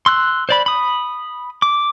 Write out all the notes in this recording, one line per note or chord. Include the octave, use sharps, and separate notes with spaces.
C6 E6 F#6
C5 D5 B5
B5 D#6
D6